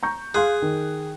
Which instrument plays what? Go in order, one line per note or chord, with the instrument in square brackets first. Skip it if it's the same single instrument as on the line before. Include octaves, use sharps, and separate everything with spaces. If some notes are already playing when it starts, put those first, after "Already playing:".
[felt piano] A#5 C#6 G6
[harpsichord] G#4 [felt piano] F5 C6 F#6
[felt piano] D#3